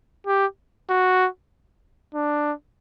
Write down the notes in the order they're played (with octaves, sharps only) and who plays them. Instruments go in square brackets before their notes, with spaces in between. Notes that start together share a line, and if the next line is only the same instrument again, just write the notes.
[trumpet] G4
F#4
D4